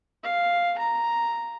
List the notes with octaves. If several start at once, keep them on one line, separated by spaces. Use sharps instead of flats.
F5
A#5